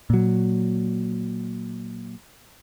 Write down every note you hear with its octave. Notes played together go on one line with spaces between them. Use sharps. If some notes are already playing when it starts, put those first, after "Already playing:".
A#2 F#3